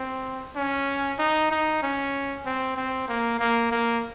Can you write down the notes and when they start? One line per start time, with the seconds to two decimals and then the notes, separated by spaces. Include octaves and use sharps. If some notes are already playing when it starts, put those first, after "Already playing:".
Already playing: C4
0.56 C#4
1.19 D#4
1.51 D#4
1.83 C#4
2.46 C4
2.77 C4
3.08 A#3
3.40 A#3
3.71 A#3